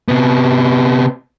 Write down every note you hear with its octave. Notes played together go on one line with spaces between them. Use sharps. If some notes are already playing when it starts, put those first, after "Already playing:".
C3 B3